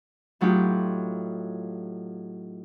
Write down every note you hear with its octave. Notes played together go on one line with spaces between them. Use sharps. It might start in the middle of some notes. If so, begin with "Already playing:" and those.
A2 F#3 D#4 F4 G4